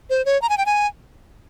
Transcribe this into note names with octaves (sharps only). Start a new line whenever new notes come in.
C5
C#5
A#5
G#5
G5
G#5